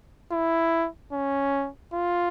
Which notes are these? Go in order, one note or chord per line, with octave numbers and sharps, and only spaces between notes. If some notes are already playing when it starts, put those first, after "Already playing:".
E4
C#4
F4